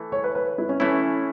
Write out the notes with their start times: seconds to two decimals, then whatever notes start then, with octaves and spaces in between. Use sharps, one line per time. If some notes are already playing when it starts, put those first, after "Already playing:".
Already playing: E3 A3
0.12 C#5
0.24 B4
0.35 B4
0.58 E4
0.69 C#4
0.80 E3 A3 C#4 E4